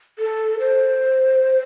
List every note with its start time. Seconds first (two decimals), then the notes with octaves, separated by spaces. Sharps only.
0.19 A4
0.60 C5